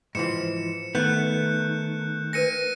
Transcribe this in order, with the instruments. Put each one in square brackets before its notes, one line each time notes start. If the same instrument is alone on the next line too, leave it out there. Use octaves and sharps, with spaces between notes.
[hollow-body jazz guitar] G#2 E3 F3 [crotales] C#7 E7
[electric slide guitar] D#3 A3 [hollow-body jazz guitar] B3 [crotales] F#6 G6
[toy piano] D4 A#4 B4 [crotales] A#6 C#7 D#7